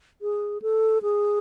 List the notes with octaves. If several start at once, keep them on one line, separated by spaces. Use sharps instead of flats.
G#4
A4
G#4